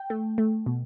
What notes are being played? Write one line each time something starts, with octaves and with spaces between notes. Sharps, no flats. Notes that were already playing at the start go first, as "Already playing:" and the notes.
Already playing: G5
A3
A3
B2